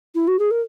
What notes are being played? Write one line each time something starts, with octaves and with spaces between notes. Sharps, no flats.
E4
F#4
G#4
A#4